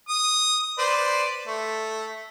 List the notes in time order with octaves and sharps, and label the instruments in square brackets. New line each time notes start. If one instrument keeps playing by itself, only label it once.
[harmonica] D#6
B4 C5 D5
A3